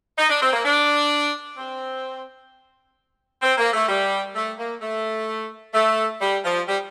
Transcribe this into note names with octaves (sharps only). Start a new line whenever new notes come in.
D#4
D4
C4
A#3
D4
C4
C4
A#3
A3
G3
A3
A#3
A3
A3
G3
F3
G3